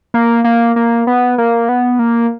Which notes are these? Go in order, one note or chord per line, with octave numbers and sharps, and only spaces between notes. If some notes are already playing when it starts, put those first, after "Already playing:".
A#3
A#3
A#3
B3
A#3
B3
A#3